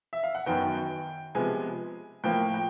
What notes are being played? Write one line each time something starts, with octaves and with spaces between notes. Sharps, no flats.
E5
F5
F#5
F#2 D#3 F#3 B3 G5
C3 F3 G#3 B3 G#5
A2 F3 A#3 G5
G5